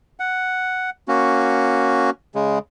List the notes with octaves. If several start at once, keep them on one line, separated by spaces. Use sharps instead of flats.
F#5
A#3 C#4 F#4
C#3 G#3